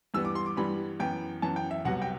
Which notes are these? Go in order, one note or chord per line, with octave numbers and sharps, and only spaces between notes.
G2 E3 G3 B3 E6
D6
C6
D6
G2 E3 G3 B3 B5
F#2 E3 B3 G5
F#2 E3 B3 A5
G5
E5
C2 C3 F#3 B3 F#5
G5